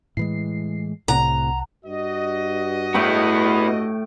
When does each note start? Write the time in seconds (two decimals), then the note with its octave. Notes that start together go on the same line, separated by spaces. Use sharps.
0.17 A2 E3 G#3 C7
1.08 C2 A2 C3 F#5 A#5
1.85 G2 F#4 D#5
2.94 A2 B3 E4 G5 C#6